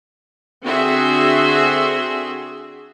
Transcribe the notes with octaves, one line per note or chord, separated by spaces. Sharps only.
D3 C4 F#4 G#4 E5 C6